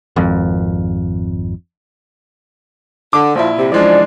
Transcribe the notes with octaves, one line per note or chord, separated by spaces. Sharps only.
G#1 F2
D3 D6
A#1 F3 E4
C3
C#3 E3 F3 G#3 D4 D5